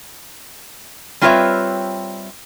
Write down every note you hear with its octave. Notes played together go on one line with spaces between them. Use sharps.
G3 C4 F4 B4 C#5 E5